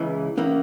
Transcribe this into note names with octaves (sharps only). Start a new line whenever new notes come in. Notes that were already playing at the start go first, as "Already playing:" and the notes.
Already playing: C#2 C#3 E3
E3 A#3 C#4